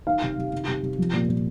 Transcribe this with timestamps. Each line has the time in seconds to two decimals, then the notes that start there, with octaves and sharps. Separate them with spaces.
0.07 D#3 F5
0.22 C3
0.38 C3
0.52 D#3
0.67 C3
0.83 C3
0.98 F3
1.13 A#2
1.29 A#2